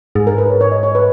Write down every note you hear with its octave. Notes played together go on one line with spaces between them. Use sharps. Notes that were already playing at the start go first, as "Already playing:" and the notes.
G#2 G#4
A#4
B4
C#5
C#5
D#5
C#5
B4